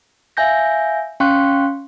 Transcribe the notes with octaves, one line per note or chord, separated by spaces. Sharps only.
E5 F5 G#5 G6 A#6
C#4 F5 G5 C6 C#6 F#6